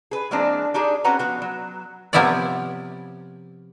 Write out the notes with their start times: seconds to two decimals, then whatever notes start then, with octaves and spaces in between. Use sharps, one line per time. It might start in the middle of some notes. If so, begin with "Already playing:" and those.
0.11 G#4 B4
0.31 E3 G#3 A#3 C4 D4
0.74 D4 D#4 G4 G#4
1.04 C4 C#4 F#4 B4 F#5 A#5
1.19 F3 B3 F#4
1.42 F#3
2.13 C3 F3 B3 E4 C#5 D5